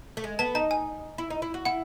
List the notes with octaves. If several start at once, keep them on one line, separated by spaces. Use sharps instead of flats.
A3
G#3
B3 A5
D#4 A5
G#5
E4
D#4
E4
F#4
E4 F#5